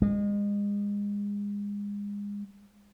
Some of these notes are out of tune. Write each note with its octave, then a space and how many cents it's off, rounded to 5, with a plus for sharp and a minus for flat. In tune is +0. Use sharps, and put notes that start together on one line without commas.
G#3 -30